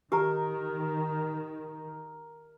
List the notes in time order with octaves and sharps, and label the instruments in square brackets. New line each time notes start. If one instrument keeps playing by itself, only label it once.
[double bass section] D#3 [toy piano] G4 A#5 [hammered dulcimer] A#4